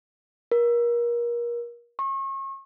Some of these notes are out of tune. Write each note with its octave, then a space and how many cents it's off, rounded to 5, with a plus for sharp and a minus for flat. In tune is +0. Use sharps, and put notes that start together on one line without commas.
A#4 +30
C#6 -35